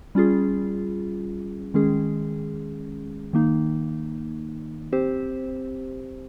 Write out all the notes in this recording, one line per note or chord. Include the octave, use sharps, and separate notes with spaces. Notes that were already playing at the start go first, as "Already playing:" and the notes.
G3 C#4 F4 G#4
D#3 G#3 C#4 G#4
D#3 A#3 D#4
C4 G4 C5